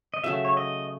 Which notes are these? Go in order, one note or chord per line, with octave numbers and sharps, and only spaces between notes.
D#5
C#3 F#3 A3 E5
C#5
D#5